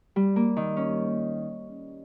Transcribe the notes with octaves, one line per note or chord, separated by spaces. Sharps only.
G3
A#3
D#3
C#4